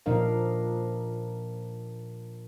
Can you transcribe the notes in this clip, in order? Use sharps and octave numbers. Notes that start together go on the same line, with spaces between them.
A#2 F3 D4 A#4 D#5 F5